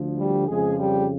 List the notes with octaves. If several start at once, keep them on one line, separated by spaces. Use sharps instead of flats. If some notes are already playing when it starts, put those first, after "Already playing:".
Already playing: D2 D3 F3
G3 G4
F2 C#3 F3 G#3 G#4
G3 G4